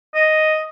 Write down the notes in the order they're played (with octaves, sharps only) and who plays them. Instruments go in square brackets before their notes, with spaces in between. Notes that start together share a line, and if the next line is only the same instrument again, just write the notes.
[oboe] D#5